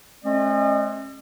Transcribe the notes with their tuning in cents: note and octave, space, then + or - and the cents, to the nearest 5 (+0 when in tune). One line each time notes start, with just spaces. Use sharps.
G#3 +40 C#4 -40 D#5 -40